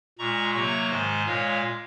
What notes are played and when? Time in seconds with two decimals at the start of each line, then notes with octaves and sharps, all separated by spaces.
0.19 A#2 G#3 A#5 C#6
0.54 C3 F#3 A#3 A#5 C#6
0.90 G#2 D#3 G#3 C5 D#5
1.26 A#2 G#3 C#5 F5